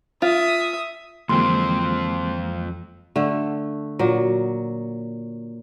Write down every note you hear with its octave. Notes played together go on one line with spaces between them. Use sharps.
F4 E5 D#6
F2 D3 E3 F#3 G#3 A#3 C4 C6
D3 A3
A#2 F#3